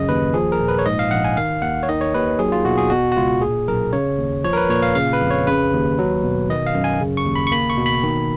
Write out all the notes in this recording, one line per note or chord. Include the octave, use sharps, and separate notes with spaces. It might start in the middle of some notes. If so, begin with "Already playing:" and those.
Already playing: F#2 C#3 D#5
D#2 B4
F3 G#4
A#4
A#2
B4
C#5
G#2 D#5
F5
A#1 F#5
G#5
D#3 F5
D#2 F#5
C#5
D#3 D#5
C#5
D#2 B4
F#3 G#4
F4
B2 F#4
G#4
B2 F#4
F#4
C#2 F4
A#2 G#4
B1 A#4
C#3 C#5
D#2
F3 C#5
A#4
B4
A#2 C#5
F5
C#3 F5
B4
F2
C#5
C#3 B4
D#2
F#3
B2
D#3 D#5
F5
F#2
G#5
C#3
C#6
D#2
B5
C#6
A#3 B5
C#6
B2
B5
D#3